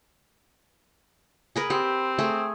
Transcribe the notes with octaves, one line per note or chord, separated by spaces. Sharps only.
G#4 A#4 B4
C4 G4
A3 G#4